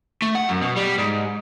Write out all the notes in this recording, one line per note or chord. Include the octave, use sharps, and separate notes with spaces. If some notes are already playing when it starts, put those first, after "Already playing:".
A3
F#5
F#2
B2
G3
G#2